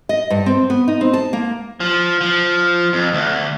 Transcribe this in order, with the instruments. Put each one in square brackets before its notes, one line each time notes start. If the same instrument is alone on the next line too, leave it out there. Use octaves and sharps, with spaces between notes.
[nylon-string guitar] D#5
G2
C4
B3
D#4
C4
A5
A#3
[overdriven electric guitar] F3
F3
F2
D2